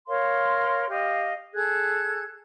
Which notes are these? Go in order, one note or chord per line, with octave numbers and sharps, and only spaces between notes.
A#4 C#5 F5 C6
G4 D#5 F5
G#4 A4 F#6 G#6